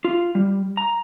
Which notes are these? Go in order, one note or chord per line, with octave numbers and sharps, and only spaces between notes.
F4
G3
A#5